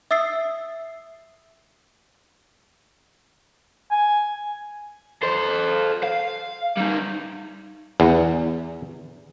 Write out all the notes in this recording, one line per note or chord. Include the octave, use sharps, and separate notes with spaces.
E5 D#6 E6 A6 C7
G#5
A4 C5
F5
G3 D#4
E2